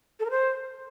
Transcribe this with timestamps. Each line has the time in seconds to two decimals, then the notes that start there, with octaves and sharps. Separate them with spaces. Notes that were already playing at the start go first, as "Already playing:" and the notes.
0.19 A4
0.25 A#4
0.30 C5